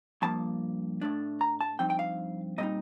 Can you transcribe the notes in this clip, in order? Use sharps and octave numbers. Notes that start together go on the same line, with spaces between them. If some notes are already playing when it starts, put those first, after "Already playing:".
G2 F3 A#3 A5
A2 A3 D4
A#5
A5
G2 F3 C4 D#4 G5
G5
F5
A#2 G3 C4 D#4 D#5